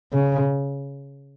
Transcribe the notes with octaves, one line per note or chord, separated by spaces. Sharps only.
C#3